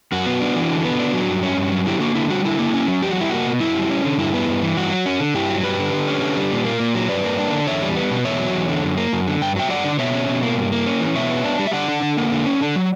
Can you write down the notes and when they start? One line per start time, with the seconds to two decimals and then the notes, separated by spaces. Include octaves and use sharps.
0.12 F#2 F#4
0.26 B3
0.41 D4
0.56 E3
0.70 D3
0.85 B3
0.99 D4
1.14 F#3
1.28 G2
1.43 C#4
1.57 G2
1.72 F#3
1.86 D3 E4 G4
2.00 A#3 F#4
2.15 D3 E4
2.30 G3 F#4
2.45 D3 E4
2.59 A#3
2.74 C#4
2.88 F#3
3.02 E2 G4
3.11 F#4
3.17 G3 E4
3.30 A#3 F#4
3.46 B2
3.60 F#2 E4
3.75 G3
3.90 C#4
4.04 D3
4.18 G2 E4
4.33 B3
4.48 G2
4.62 E3
4.77 G2 F#4
4.91 F#3
5.06 C#4
5.20 D3
5.34 G2 E4 G4
5.49 F#3
5.63 G2 G4 B4
5.79 D3
5.93 D3
6.08 C#4
6.22 D3
6.37 G3
6.51 A#2
6.65 A#3
6.80 A#2
6.95 F#3
7.09 G2 B4 D5
7.24 A#3
7.38 D4
7.52 D3
7.67 E2 C#5 E5
7.82 G3
7.96 B3
8.11 B2
8.25 E2 C#5 E5
8.39 F#3
8.54 E2
8.68 D3
8.83 F#2
8.97 A#3
9.13 F#2
9.27 D3
9.41 G2 G5
9.56 F#3 E5 G5
9.70 G2 D5 F#5
9.84 D3
9.99 B2 C#5 E5
10.14 C#4
10.29 B2
10.43 A#3
10.57 G2
10.72 A#3
10.86 C#4
11.00 E3
11.16 B2 C#5 E5
11.30 B3
11.44 D4
11.59 G3
11.67 E5
11.73 D3 D5 F#5
11.88 D4
12.02 D3
12.17 A#3
12.32 D3
12.46 C#4
12.61 D3
12.76 F#3